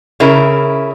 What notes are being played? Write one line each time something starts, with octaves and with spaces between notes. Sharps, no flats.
C#3 E4 A#4